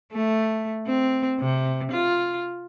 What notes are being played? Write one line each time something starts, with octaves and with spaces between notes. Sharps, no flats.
A3
C4
C3
F4